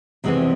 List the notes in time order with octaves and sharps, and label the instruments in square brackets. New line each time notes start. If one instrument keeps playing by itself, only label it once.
[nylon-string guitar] E2 C3 E3 G#3 C4